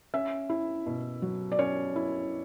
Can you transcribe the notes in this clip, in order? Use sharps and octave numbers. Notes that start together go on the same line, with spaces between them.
C#4 E5
E4
B2
F#3
D5
C#4 C#5
E4